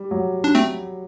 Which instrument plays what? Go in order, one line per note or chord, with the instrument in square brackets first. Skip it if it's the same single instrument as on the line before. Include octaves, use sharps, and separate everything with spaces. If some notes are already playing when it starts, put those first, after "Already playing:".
Already playing: [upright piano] G3
F#3
[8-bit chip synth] D4
A3 C4